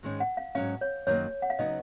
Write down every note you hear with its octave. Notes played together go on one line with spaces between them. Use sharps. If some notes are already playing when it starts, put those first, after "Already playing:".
G#2 D#3 G#3 C#4
F#5
F5
G#2 F#3 C#4 F5
C#5
F#2 D#3 F#3 A#3 C#5
F#5
F5
C#3 F#3 B3 D#4 D#5